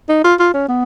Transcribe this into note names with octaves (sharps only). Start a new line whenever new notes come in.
D#4
F4
F4
C#4
B3